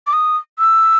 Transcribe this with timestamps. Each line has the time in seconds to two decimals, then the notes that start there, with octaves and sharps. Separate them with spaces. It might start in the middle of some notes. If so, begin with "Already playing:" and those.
0.07 D6
0.13 D#6
0.59 E6